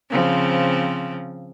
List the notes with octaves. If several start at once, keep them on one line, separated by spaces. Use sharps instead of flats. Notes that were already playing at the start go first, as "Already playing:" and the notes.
C#3 F3 C4